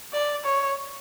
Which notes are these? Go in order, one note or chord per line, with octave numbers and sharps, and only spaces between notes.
D5
C#5